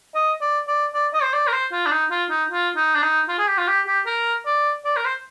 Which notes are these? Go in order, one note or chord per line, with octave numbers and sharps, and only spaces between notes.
D#5
D5
D5
D5
D#5
C5
D5
A#4
C5
F4
D4
D#4
F4
D#4
F4
D#4
D4
D#4
F4
G#4
G4
F4
G4
G4
A#4
D5
D5
A#4
C5